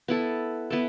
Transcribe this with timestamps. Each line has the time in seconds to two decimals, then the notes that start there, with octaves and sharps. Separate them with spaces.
0.08 B3 E4 A4
0.70 B3 E4 A4